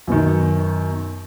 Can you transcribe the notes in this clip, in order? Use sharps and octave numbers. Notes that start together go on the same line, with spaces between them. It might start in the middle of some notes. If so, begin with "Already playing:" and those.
F#2 B2 D#3